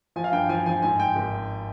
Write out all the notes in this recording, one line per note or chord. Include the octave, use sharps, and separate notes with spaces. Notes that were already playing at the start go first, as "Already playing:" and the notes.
F3 G#5
F5
G2 G5
F3 G#5
F3 G#5
G#2 G#5
G#2 G5
G#1